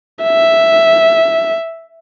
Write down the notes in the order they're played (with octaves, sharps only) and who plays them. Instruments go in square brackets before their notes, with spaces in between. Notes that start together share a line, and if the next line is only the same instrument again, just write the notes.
[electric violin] E5